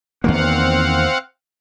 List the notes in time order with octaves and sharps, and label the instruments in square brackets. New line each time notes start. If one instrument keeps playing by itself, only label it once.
[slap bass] E2 D#3 A#3 [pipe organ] C4 F5 F#5